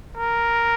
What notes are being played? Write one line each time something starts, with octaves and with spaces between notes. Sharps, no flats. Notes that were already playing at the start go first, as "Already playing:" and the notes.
A#4